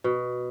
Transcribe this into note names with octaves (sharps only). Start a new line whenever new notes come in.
B2